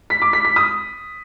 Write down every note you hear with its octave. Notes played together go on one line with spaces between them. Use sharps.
B6
D6
B6
B6
D#6